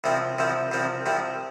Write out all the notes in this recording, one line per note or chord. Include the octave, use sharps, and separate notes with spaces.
C2 C3 F3 C4
C2 C3 F3 C4
C2 C3 F3 C4
C2 C3 F3 C4